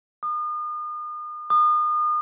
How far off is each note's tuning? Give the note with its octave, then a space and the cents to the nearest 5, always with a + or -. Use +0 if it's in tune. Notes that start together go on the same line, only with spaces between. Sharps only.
D#6 -40
D#6 -35